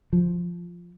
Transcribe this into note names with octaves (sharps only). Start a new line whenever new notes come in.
F3